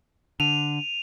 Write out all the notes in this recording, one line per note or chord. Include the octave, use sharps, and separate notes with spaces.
D3 D#7 F7